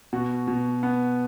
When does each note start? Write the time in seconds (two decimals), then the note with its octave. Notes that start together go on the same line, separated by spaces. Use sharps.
0.13 B2 F#4
0.48 B2
0.83 B3